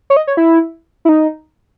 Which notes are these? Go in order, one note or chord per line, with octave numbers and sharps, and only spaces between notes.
C#5
D#5
C#5
E4
E4
D#4